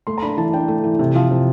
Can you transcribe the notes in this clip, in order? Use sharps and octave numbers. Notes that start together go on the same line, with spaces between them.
A3 C6
A#5
D4 B5
E3 A5
D4 G5
A3
E3
C3
F3
C3